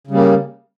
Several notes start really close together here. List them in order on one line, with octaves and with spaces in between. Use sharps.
C#3 G3 A#3